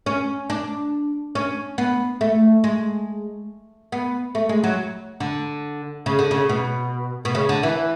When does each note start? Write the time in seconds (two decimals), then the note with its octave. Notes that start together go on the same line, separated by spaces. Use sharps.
0.06 C#4
0.50 D4
1.35 C#4
1.78 B3
2.21 A3
2.64 G#3
3.92 B3
4.35 A3
4.49 G#3
4.63 F#3
5.20 D3
6.06 C#3
6.19 D3
6.31 C#3
6.49 B2
7.25 B2
7.35 C#3
7.49 D3
7.63 E3